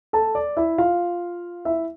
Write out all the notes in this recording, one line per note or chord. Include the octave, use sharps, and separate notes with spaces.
A4 A5
D5
E4 E5
F4 F5
E4 E5